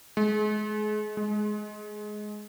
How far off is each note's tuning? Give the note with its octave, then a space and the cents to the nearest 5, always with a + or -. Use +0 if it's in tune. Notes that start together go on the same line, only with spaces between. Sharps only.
G#3 +35
G#3 +15